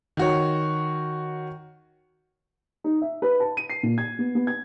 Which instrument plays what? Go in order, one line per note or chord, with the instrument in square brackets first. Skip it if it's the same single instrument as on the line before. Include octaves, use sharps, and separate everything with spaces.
[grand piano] D#3 F#4 C#5
[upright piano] D#4
E5
B4
A5
D#7
C7
A#2
G#6
B3
B3
G#6